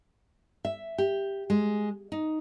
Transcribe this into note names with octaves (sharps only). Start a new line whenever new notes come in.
E5
G4
G#3
D#4